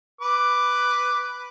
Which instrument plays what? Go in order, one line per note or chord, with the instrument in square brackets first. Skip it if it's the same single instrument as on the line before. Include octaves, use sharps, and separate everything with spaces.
[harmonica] B4 D6